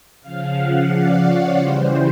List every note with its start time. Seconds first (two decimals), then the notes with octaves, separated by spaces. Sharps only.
0.22 C#3 F3 F5
0.55 F#5
0.89 D5
1.22 C#5
1.55 C#3 E3 G3 C5